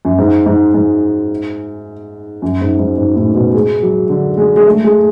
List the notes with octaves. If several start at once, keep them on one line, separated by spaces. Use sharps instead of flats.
F#2
G#2
G#2
G#2
F#2
G#2
G#2
G#2
A2
B2
G#3
F#3
D3
G#3
G#3
A3
G#3